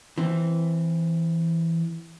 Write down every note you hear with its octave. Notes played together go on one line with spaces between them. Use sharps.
E3 C4